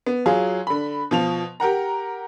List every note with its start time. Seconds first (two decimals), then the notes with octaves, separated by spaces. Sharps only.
0.06 B3
0.26 F#3 F4 G#4
0.67 D3 B5
1.11 B2 F3 F7
1.60 G4 A#4 F#5 A#5